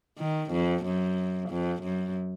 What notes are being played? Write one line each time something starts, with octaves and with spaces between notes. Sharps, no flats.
D#3
F2
F#2
F2
F#2